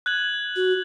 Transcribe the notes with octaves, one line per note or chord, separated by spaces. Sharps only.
F#6 G#6 F#7
F#4